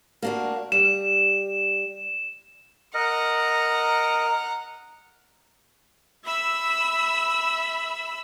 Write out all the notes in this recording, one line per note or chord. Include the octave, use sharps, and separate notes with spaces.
A#3 D4 F#4
G3 E7
A#4 D#5 F#5 A#5
E5 B5 E6